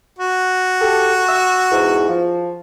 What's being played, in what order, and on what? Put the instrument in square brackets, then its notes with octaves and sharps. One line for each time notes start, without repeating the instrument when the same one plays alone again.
[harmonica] F#4
[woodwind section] G4 A4
E6
E2 G#2
F3